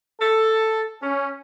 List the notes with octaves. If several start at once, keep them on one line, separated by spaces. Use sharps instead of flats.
A4
C#4